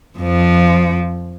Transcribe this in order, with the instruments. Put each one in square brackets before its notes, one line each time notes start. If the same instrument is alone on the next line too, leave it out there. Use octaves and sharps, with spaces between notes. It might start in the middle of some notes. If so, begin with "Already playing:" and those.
[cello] F2 F3